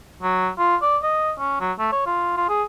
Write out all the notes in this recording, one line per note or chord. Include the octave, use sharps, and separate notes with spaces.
F#3
F4
D5
D#5
C#4
F#3
A3
C#5
F4
F4
G#4